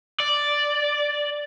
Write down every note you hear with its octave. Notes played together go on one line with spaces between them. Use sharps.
D5